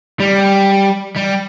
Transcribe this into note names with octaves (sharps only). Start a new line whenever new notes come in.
G3
G3